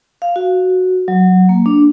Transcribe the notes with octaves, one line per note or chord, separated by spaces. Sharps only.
F5
F#4
F#3
A#3
D4